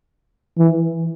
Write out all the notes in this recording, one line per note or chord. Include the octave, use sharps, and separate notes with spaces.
E3